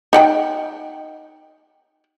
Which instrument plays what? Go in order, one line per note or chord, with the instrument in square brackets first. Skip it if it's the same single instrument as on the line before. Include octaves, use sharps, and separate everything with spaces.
[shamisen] D#4 F#5 G5